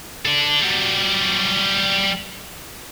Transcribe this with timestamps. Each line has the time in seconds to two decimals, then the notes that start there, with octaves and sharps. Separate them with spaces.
0.26 A4 D5
0.62 F#3 G3